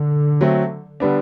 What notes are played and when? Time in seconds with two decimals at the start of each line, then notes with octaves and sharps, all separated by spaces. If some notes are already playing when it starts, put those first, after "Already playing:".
Already playing: D3
0.41 F#3 A3 C4
1.00 D3 G3 B3 D4